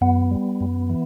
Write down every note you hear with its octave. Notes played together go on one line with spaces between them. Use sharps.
F#2 B3
G3
F#2
E3